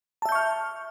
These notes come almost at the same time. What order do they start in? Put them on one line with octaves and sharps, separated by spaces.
A5 E5 G6 C#6 F6